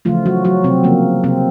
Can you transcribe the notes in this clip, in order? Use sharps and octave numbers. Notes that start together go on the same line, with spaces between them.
C#3 E3 F3 A3 F4
F#3 F#4
F#3 F#4
C3 C4
C#3 F3 A#3
C3 C4